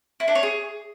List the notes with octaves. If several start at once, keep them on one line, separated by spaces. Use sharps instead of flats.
E4
D4
C#5
G#4